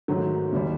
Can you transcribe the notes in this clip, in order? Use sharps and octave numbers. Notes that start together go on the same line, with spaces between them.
G#2 D#3 F#3 A3
D#2 D#3 G3